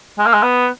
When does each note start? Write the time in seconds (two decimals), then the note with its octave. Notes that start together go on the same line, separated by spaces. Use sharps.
0.19 G#3
0.26 A#3
0.34 G#3
0.43 B3